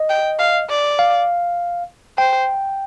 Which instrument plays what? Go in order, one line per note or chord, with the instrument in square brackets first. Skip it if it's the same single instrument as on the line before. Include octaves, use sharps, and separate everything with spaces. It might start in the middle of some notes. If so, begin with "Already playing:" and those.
Already playing: [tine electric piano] D#5
[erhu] G5
F5
D5
[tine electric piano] F5
[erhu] C5 [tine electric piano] G5